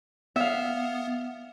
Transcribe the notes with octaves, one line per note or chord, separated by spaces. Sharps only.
B3 E5 F5